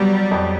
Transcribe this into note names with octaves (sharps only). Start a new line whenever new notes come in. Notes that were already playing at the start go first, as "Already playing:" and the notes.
Already playing: F#3 G3 B3
F2